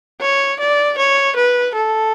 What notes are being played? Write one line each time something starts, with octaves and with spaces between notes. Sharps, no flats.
C#5
D5
C#5
B4
A4